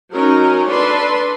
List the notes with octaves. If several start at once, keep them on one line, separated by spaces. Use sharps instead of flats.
F#3 C#4 D#4 A#4
D4 A4 B4 D5 C6